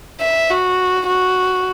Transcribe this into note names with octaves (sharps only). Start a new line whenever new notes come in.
E5
F#4
F#4